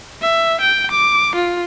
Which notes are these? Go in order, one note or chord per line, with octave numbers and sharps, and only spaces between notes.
E5
G5
D6
F4